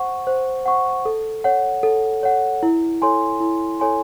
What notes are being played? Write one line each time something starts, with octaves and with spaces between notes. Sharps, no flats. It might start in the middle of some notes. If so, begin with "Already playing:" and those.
Already playing: C5 F#5 C#6
C5
F#5 C#6
A4
C#5 F#5
A4
C#5 F#5
E4
A4 C#5 G#5 C6
E4
A4 C#5 G#5 C6